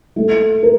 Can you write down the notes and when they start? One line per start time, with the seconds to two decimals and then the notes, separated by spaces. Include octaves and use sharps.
0.16 A3
0.63 A#4